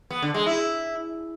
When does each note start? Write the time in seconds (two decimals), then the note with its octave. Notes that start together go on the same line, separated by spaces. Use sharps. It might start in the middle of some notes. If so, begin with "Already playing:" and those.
0.11 B3
0.22 D3
0.34 G#3
0.46 E4